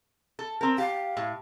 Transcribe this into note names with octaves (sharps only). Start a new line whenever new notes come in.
A4
C4 A#4
G4 F5
A2